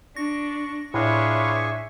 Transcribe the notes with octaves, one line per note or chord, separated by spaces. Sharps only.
D4 C#6 A#6
A2 D4 F4 G#4 B4 C#5 E5 C#6